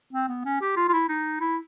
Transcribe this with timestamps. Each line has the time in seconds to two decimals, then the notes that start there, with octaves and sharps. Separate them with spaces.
0.13 C4
0.28 B3
0.45 C#4
0.61 G4
0.76 F4
0.89 F4
0.93 E4
1.09 D#4
1.40 E4